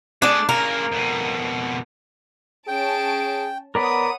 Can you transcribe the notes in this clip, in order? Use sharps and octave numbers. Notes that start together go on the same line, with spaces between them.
A3 D4 G#4 D5
C#3 A#3 A#4
F2 B2
C#4 G#4 G5 A5 D7
B3 A#4 C#5 D5 F#5 B5 D#6